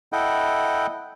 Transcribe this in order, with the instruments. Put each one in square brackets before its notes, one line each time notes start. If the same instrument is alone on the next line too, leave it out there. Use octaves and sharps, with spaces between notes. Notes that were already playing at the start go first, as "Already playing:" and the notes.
[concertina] E4 A4 D#5 F#5 G5